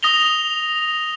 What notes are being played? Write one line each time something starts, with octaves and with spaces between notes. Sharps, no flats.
D#6 A#6 F7 G7